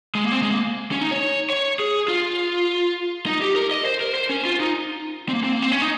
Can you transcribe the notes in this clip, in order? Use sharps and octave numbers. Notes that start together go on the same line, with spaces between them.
G#3
A#3
C4
G#3
A#3
C#4
D#4
C#5
C#5
G#4
F4
D#4
G4
A#4
D#5
C5
A#4
C5
C#4
F4
D#4
C4
A#3
C4
A#3
C4
C#4
D#4